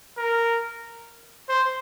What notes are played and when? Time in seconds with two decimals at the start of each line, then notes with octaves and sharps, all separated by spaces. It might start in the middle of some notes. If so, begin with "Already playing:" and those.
0.17 A#4
1.49 C5